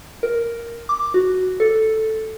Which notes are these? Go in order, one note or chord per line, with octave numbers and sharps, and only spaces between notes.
A#4
D6
F#4
A4